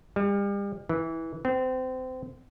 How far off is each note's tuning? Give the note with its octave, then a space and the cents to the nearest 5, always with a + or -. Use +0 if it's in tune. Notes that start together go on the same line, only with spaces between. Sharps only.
G3 +40
E3 -15
C4 -25